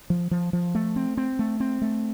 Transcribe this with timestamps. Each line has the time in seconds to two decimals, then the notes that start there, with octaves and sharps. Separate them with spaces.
0.10 F3
0.31 F3
0.53 F3
0.75 A3
0.96 C4
1.17 C4
1.39 A3
1.60 C4
1.82 A3